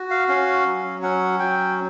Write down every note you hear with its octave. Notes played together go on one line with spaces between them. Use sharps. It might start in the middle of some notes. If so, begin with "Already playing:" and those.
Already playing: F#4
F5
C#4 F5
F#3
C#4 F#5
F#3 G5